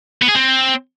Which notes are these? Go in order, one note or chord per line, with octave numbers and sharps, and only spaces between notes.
B3
G#4
C4